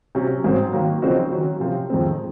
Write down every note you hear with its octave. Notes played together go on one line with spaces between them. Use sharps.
C3 F#3 C#4
G#2 F#3 C4
D#3 F#3 A#3
C#3 F3 C4 D#4 F#4
D#3 F#3 C#4
C3 F3 C4 F4
F2 D#3 G#3 C4